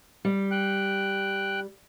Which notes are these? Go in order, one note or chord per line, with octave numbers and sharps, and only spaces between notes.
G3
G5 F#6